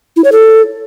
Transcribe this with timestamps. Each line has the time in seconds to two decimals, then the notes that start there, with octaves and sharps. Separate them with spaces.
0.16 E4
0.24 C#5
0.32 A4